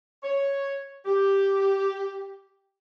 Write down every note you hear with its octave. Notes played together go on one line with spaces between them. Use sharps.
C#5
G4